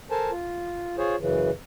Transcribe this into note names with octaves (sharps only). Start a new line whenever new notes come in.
A4 A#4 C5 G#5 A5
F4
F4 G#4 C5 C#5
F#2 C#3 E3